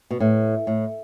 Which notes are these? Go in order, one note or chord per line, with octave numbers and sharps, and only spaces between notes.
B2
A2
A2